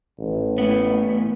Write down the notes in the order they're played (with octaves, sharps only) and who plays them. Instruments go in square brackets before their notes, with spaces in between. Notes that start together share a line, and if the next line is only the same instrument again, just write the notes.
[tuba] A1
[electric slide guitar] A2 B3